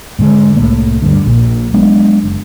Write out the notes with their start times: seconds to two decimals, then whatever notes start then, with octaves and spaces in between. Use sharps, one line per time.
0.19 G#2 D3 G#3
0.56 C2 A2 A#3
1.02 D2 G2 D3
1.26 A#1 A#2
1.74 F#3 G#3 B3 D4
2.23 F#1